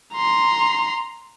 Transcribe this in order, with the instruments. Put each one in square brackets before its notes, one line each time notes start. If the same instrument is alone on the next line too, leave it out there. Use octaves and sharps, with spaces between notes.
[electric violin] A#5 C6